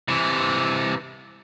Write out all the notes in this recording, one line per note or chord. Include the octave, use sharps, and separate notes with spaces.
C3 E3